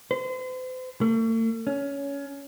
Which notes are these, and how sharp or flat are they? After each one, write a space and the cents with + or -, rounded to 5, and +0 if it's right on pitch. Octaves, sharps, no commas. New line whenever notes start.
C5 -40
A3 +40
C#4 +20